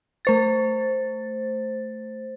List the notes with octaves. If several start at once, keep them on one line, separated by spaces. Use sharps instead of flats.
A3 C5 A6